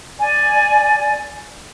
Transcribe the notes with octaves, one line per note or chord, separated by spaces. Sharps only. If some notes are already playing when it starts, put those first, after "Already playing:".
D5 G#5